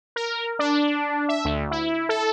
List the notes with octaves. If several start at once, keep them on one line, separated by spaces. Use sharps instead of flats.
A#4
D4
E5
D2
E4
A4